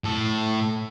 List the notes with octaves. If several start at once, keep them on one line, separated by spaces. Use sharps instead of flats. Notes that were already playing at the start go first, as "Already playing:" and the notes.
A2 A4